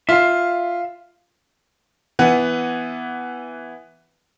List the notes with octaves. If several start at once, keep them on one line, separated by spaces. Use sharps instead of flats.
F4 E5 F5
E3 B3 F#5